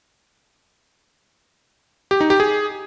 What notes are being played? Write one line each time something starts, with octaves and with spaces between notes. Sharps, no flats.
G4
D#4
G4
G#4